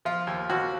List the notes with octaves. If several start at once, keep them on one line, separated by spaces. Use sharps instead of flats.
F3 F4
D#2
D#2 F#4